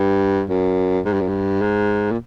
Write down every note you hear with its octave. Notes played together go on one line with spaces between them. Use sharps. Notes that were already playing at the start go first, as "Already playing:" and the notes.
Already playing: G2
F#2
G#2
G2
F#2
G2
G#2
A#2